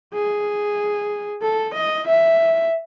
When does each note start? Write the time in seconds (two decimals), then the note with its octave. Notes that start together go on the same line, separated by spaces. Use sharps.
0.14 G#4
1.42 A4
1.74 D#5
2.07 E5